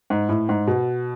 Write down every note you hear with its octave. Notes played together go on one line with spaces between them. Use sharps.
G#2
A2
G#2
B2